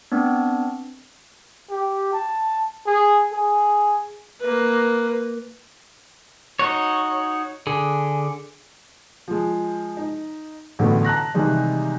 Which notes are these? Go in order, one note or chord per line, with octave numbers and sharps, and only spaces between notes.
B3 C4 D4
G4
A5
G#4
G#4
A#3 B4
D#4 F#4 C#5
D3 G#4
F3 G#3
D#4
A1 A2 D3 F#3 A3 B3
A5 A#5 F#6 A#6
C3 D#3 E3 G3 G#3 D#4